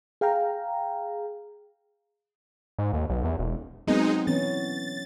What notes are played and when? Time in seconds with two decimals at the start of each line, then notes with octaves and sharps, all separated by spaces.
0.21 G#4 F5 G5 A#5
2.79 G#2
2.93 D#2
3.10 B1
3.24 E2
3.39 E1
3.87 F#3 G#3 B3 C4 D#4
4.27 E3 B3 C#4 A6